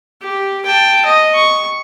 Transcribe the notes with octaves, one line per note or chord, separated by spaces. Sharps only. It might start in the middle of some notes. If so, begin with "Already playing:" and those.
G4
G5 A5
D#5
C#6